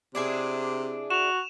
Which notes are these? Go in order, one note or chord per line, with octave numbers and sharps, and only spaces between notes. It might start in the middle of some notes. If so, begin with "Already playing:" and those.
C3 D4 E4 G#4
F#4 E7 F7